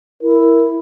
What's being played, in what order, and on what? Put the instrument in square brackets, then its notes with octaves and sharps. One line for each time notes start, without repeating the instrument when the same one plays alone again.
[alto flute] E4 [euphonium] A#4